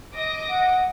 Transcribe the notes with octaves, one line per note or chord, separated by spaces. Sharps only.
D#5 D6 A#6
F#5